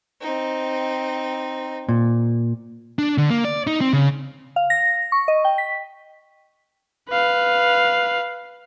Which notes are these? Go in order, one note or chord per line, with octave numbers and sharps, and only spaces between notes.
C4 D#4
A#2
D4
D3
A#3
D5
D#4
C4
C#3
F5
A#6
C#6
D#5
G5
B6
B4 F5